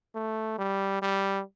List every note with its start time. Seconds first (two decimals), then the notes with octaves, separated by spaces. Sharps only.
0.15 A3
0.59 G3
1.02 G3